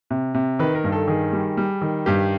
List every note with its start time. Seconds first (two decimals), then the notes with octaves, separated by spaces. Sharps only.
0.10 C3
0.34 C3
0.59 D#3 B4
0.75 A#4
0.84 G2
0.92 A4
1.08 D#3 G#4
1.33 G3
1.57 G3
1.81 D#3
2.06 G2 G4